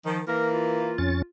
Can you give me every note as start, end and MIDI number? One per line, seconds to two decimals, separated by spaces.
0.05 0.19 51
0.05 0.20 53
0.27 0.95 52
0.27 0.95 58
0.27 0.47 70
0.53 1.27 65
0.98 1.22 41
0.98 1.22 61
0.98 1.22 93